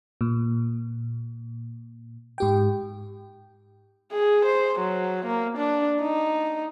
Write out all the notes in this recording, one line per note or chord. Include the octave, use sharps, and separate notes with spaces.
A#2
G#2 G4 G5
G#4
C5
F#3
A#3
D4
D#4